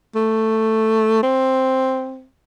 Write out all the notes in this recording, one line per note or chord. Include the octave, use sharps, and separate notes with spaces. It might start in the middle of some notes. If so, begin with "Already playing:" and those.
A3
C4